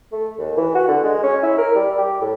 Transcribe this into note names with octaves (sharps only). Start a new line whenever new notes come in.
A3
D#2
E3
F#4
D3
G#3
C#4
E4
A#4
G3
G4
A2